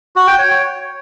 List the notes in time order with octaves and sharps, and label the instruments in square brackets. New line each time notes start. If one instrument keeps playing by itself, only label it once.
[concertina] F#4
G5
C#5